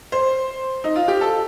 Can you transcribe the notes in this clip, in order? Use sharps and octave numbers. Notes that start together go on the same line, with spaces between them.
C5
D#4
F4
G4
A4